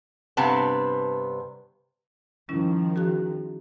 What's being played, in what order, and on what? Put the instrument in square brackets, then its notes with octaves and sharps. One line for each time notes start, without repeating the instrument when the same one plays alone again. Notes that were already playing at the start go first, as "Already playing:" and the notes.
[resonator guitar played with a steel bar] G2 C3 B3 A5
[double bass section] D#3 F3 [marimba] G3 C#4 E4
[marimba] F#4 G#4 F#6